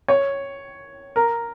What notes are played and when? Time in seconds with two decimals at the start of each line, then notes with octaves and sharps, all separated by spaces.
0.08 C#5
1.16 A#4